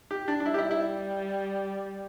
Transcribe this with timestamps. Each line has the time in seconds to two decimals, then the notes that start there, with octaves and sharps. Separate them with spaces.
0.11 G4
0.28 D4
0.40 D4
0.45 G3 E4
0.54 G4
0.58 E4
0.71 E4